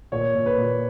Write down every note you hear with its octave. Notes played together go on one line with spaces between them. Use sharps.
A#2 C#5
A#2
B4
A#2